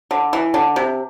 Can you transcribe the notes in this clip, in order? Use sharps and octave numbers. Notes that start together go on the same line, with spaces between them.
D3
E3
D3
C3